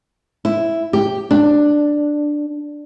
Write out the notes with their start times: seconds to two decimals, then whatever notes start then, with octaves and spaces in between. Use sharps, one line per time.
0.45 E4
0.93 G4
1.31 D4